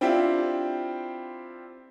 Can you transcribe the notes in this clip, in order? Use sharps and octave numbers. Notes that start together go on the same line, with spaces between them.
C4 D4 E4 F4 G4